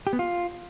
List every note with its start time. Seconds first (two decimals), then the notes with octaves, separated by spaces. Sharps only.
0.07 G4
0.13 B3
0.19 F4